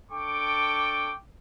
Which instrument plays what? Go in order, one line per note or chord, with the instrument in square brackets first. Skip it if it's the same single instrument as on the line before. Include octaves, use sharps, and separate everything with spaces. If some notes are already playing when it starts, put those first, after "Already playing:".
[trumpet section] D4 A4 G5 C#6 D6